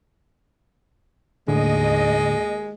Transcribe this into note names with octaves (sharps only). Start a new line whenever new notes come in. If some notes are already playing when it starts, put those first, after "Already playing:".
D#2 A2 D3 G#3 D#5